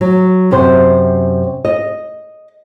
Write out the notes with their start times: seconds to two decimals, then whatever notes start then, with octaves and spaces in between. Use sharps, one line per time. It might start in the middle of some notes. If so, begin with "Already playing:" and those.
0.01 F#3
0.51 F#2 C3 C5
1.65 D#5